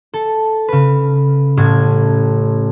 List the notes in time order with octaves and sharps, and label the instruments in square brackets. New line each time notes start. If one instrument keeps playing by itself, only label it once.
[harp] A4
C#3 B4
A1 A2 G#6